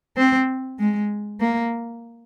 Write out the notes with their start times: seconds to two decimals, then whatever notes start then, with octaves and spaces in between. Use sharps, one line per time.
0.17 C4
0.79 G#3
1.40 A#3